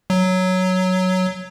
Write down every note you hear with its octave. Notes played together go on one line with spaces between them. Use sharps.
F#3